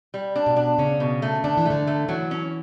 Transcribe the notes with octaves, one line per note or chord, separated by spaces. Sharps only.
G3
D4
B2
D4
C#3 C#4
B2
A3
D3 D4
E3
D3 A3
A3
E3 F#3
C#4